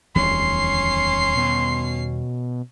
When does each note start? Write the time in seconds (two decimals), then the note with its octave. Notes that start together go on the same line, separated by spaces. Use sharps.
0.15 D1 E2 D#3 G3 C#4 C6 C7
1.36 B2